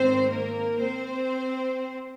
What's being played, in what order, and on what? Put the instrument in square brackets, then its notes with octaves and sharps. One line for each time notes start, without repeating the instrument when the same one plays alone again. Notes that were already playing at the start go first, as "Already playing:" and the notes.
Already playing: [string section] G#2 D#3 C4 C5
A#3 A#4
C4 C5